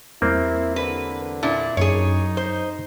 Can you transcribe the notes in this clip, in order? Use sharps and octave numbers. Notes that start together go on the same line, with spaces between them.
E2 G3 A#3 C4 E4
D3 B4
A#2 D4 E4
F#2 D#4 G#4 C#5
C5